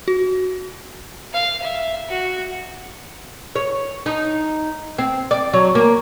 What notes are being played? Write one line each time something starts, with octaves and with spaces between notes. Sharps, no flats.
F#4
F5
E5
F#4
C#5
D#4
C4
D5
F#3
A#3